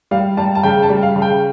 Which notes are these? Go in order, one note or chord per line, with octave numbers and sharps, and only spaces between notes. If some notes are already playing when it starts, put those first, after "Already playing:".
G3 F5
G3 A5
A5
C#3 G5
A5
G3
F5
C#3
G5